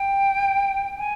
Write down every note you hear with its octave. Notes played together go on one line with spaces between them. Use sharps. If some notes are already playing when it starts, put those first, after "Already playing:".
Already playing: G5
G#5